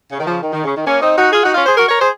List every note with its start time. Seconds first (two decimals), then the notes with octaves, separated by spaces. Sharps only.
0.12 C#3
0.19 D#3
0.26 C#3 F3
0.42 D#3
0.53 D#3
0.64 C#3
0.76 D#3
0.86 A#3 C#4
1.02 C4 D#4
1.17 D#4 F#4
1.32 F4 G#4
1.43 D#4 F#4
1.54 C#4 F4
1.65 G#4 C5
1.77 F#4 A#4
1.88 A#4 C#5
2.00 G#4 C5